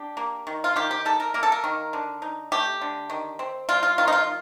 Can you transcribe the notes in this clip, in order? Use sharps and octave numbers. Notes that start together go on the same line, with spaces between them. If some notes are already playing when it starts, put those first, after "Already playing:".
Already playing: D4 G4
A#3
D#3
F4
D#3 G4
G4
D#4 A4
A#4
A#3 A#4
A4
A#4
D#3
D3
D#4
A3 G4
D3
D#3
C4
G3 F4
F4
D#3 F4
D#4
F4